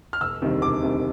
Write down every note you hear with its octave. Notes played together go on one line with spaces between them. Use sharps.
F6
E1 E6
D2 C3 D#3 G3
E1 D6
D2 C3 D#3 G3